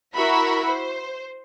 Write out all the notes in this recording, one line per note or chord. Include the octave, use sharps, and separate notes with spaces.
E4 F#4 A#4 E5 B5
C5